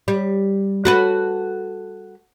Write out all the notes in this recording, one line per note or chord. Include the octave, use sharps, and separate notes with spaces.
G3
F#4 A4 B4